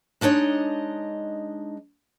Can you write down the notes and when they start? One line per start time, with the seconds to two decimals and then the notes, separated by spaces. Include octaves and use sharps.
0.21 G#3 D4 D#4 C#5 D#5